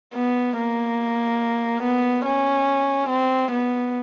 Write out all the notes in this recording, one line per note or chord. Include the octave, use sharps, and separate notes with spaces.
B3
A#3
B3
C#4
C4
B3